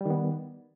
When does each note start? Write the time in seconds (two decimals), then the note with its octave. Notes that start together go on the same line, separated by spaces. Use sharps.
0.01 G3
0.06 D#3
0.10 B3